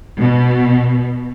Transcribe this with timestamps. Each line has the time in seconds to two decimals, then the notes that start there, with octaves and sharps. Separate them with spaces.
0.20 B2